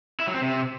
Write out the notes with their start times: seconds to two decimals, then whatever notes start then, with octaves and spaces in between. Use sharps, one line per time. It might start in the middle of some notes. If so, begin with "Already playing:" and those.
0.20 E4
0.27 F#3
0.34 C4
0.42 C3